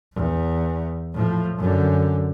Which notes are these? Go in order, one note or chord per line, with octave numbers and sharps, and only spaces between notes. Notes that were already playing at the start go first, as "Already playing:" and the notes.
E2
A2 F3
F#2 D3